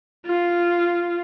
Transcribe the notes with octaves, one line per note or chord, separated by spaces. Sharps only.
F4